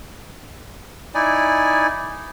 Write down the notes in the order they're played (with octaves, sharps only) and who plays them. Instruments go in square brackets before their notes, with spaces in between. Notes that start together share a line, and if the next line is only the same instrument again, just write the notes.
[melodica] D#4 E4 D5 G#5